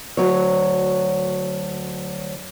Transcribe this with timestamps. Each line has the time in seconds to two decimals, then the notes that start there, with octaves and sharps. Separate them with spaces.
0.17 D2 F#3 C#5